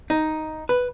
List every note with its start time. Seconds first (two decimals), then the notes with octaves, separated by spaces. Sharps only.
0.10 D#4
0.69 B4